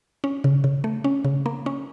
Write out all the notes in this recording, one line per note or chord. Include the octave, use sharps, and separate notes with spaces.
C#4
C#3
C#3
A3
C#4
C#3
A#3
C#4